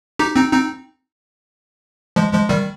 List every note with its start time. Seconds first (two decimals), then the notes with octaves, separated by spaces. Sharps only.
0.19 D#4 G4
0.36 C4 D#4
0.52 C4 D#4
2.16 F3 G#3
2.33 F3 G#3
2.49 D#3 G3